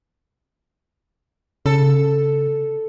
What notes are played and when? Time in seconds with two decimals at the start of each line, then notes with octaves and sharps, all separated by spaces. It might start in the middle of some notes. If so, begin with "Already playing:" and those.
1.66 C#3 A4